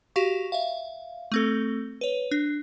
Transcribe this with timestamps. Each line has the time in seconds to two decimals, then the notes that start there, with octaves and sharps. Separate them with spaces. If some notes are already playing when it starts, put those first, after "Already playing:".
0.16 F#4 G4 F5 C#6
0.52 E5 F5
1.32 A3 C4 A4
2.01 B4 C#5
2.31 D4